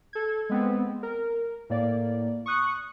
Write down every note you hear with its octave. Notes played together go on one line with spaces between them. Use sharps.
A4 G#6
G#3 B3 C4
A#4
A2 A#3 D5
C#6 D#6 F#6 C#7